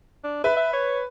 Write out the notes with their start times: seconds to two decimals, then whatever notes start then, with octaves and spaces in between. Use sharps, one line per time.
0.24 D4
0.44 B4 E5
0.57 E5
0.73 C#5